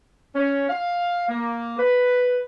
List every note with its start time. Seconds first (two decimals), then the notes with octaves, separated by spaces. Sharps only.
0.35 C#4
0.69 F5
1.29 A#3
1.78 B4